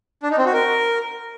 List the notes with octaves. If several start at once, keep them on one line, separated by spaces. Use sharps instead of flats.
D4
D#4
C4
F#4
A#4